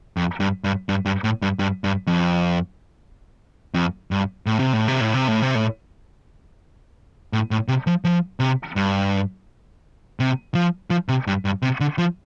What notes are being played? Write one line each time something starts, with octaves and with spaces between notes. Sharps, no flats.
F2
G2
G2
G2
G2
A2
G2
G2
G2
F2
F2
G2
A2
C3
A2
C3
A2
C3
A2
C3
A2
A2
A2
C3
F3
F3
C3
G2
C3
F3
F3
C3
G2
G2
C3
D3
F3